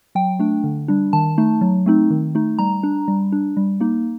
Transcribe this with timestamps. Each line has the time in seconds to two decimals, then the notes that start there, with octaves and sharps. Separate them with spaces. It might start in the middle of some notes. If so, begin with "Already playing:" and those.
0.15 F#3 G5
0.39 A3 D4
0.64 D3
0.88 G3 D4
1.13 D#3 A5
1.38 A3 D#4
1.61 F#3
1.86 A3 C4 D#4
2.11 D#3
2.35 A3 D#4
2.59 G3 A#5
2.83 D4
3.08 G3
3.32 D4
3.57 G3
3.81 A#3 D#4